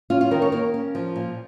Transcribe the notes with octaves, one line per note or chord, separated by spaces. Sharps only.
C#4 F4
F4
D#3 A#4
C#5
A#3 A#4
C#4
F3
A#2